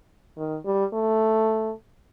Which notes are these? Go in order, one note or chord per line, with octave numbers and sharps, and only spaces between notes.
D#3
G3
A3